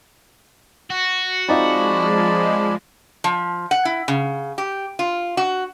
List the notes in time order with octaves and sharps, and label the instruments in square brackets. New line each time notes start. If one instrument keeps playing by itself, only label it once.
[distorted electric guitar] F#4
[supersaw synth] F3 G#3 [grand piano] C4 D#4 F4 [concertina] D5 A5 B5
[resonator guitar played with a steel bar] F3
F#5
E4
C#3
G4
F4
F#4